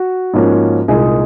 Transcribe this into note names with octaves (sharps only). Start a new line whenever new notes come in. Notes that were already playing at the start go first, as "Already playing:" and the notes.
Already playing: F#4
G#2 F3 A#3 C#4
C2 A#2 G#3 D#4 G#4